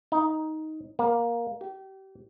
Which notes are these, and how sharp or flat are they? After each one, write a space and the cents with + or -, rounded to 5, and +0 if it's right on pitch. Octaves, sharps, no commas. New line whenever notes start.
D#4 +10
A#3 +10
G4 -30